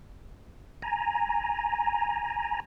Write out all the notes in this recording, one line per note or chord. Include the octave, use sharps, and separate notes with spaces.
G#5 A#5